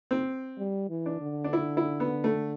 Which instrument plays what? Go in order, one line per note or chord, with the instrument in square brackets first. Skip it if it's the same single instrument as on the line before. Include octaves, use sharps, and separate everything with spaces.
[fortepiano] C4
[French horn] G3
E3
[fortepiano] D4
[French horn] D3
[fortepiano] D4
E4
E4
B3
A3